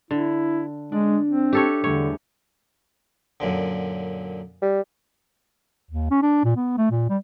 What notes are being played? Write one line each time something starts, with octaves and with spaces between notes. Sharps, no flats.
D3 E4
G#3 D4
C4
G4 A4 C#5 E5 F#6
E2 D3 G3 A3 C#5
F#2 A#2 D3
G3
D#2
C#4
D4
A#2
B3
A3
A#2
G3